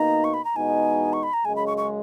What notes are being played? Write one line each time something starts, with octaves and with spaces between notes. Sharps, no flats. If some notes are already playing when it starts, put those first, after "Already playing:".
Already playing: B2 A#3 D#4 A#5
C#6
B5
A#5
E2 B2 G#3 D#4 G#5
C#6
B5
A#5
F#2 C#3 G#3 G#5
B5
C#6
C#6